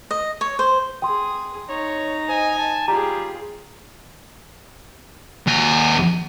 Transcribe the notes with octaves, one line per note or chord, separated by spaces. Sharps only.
D#5
C#5
C5
G#4 G5 C6 D#6
D#4 C#5 A#5
C5 D#5 G#5
A5
G3 F4 G4 G#4 A#5
D#2 G#5